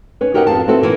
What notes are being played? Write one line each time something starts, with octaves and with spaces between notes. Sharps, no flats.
C#4 B4
F#4 G4 A#4 D#5 E5 F#5
F2 F5 A5
C4 E4 F#4 A4 B4
A#2 E3 A#3